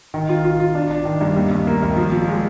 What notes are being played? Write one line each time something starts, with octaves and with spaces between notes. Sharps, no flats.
D#3
F4
F4
F4
D4
D4
D#3
G2
D#2
D#2
A#3
D#2
F3
F3
G#3